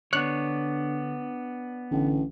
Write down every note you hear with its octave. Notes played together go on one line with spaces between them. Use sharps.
D3 B3 D4 C#5 F#6
A1 D3